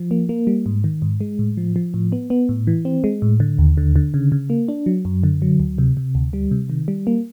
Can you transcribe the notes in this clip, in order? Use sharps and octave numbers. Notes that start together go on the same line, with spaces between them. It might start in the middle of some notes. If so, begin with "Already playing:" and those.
Already playing: F3
A#3
A#3
G3
G#2
D#3
G#2
G#3
A2
F3
F3
A2
B3
B3
A2
E3
C4
G#3
A2
D3
D#2
D3
D3
C#3
C#3
A#3
D4
F#3
F#2
D3
F#3
D2
C3
C3
D2
G3
C3
D#3
G3
A#3